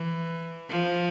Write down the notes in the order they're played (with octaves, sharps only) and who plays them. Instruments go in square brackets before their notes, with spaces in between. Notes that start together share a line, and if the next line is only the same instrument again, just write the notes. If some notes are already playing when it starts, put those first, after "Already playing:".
Already playing: [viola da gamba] E3
F3